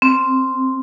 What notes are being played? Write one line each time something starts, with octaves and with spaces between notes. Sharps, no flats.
C4